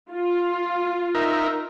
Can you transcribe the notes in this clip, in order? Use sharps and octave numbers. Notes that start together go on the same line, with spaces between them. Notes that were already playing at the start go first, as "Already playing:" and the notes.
F4
D#4 A#4 E5